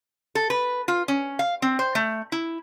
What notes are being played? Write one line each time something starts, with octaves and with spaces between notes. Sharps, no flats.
A4
B4
F4
C#4
F5
C4
C5
A3
E4